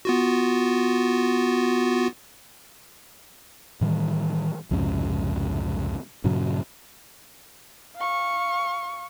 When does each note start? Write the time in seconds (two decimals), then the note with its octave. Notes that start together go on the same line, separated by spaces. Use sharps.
0.05 B3 F4 F#4
3.81 A2 D#3 E3 G3
4.71 C2 F2 G#2 C#3
6.24 G2 A#2 C#3 F#3
7.96 F5 C#6